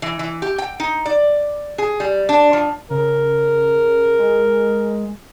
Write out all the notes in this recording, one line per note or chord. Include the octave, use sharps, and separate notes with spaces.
E3
E3
G4
G5
D#4
D5
G#4
G3
D4
F3
C#3 A#4
G#3